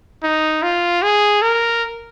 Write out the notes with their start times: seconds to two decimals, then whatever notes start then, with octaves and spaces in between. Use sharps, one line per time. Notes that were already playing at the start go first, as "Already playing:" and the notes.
0.23 D#4
0.63 F4
1.03 G#4
1.42 A#4